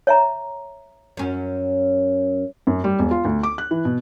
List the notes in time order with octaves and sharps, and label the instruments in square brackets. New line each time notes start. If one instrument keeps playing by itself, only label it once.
[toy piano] C#5 E5 A#5
[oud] F#2 C#4
[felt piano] F#2
G3
E1
F4
D2
D6
F#6
E3
B2